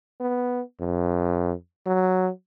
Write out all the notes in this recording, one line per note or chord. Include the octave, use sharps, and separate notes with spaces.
B3
F2
F#3